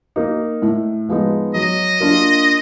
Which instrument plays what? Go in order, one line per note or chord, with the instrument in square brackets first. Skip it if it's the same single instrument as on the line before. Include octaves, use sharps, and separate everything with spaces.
[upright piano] A#3 D#4
A2
F3 G#3 B3 D#4
[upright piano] F#3 [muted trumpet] D#5
[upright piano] A#3 D4 F4